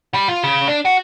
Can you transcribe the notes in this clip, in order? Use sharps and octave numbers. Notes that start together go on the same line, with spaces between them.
G3
F4
C#3
D4
F#4